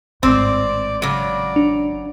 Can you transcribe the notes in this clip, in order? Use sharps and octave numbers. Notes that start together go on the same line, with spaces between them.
G#1 A2 C4 C5 D5
C#3 F#3 D5
D4